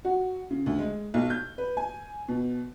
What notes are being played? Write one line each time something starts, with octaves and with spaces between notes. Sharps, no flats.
F#4
C#3
D2
G#3
B1
G6
B4
G#5
B2